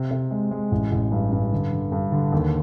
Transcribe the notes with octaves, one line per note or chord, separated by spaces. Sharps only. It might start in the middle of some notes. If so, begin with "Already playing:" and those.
Already playing: C3
C3
G#3
G#3
A1
A1
G2
G2
D3
D3
G2
D3
D#2